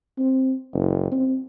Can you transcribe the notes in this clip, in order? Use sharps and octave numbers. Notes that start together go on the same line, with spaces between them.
C4
F#1
C4